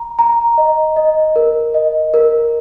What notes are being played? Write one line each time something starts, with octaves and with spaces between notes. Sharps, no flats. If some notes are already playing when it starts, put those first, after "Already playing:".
Already playing: A#5
A#5
D#5
D#5
A#4
D#5
A#4